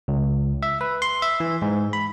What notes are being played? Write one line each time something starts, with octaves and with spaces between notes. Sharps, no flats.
C#2
E5
B4
C6
E5
E3
G#2
B5